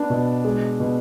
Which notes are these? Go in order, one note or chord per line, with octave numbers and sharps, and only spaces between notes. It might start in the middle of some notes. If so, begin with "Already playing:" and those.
Already playing: B3 D4
B2
G#3
B2